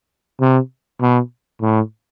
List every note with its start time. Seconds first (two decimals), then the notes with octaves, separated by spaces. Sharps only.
0.40 C3
1.01 B2
1.62 A2